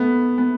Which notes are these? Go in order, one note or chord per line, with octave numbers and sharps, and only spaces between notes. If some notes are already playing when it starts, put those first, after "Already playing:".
Already playing: A3 B3
B3